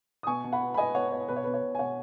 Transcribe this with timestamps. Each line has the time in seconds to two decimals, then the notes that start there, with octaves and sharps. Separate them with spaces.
0.23 D#6
0.27 B2 G#5 C#6
0.44 B2
0.53 F#5 B5
0.61 B3
0.74 B5
0.77 B3 D#5 G#5
0.95 B3 C#5 F#5
1.12 B3 C#5
1.28 B2 B4
1.36 C#5
1.44 B2 B4
1.54 C#5
1.62 B2
1.75 G#5
1.79 B2 C#5 F#5